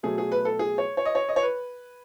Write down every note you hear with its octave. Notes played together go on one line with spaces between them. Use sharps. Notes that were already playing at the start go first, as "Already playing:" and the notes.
B2 F#3 A3 G#4
G#4
B4
A4
G#4
C#5
C#5
D#5
C#5
D#5
C#5
B4